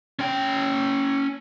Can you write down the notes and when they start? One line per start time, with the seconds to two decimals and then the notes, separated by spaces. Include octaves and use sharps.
0.19 C#4 G5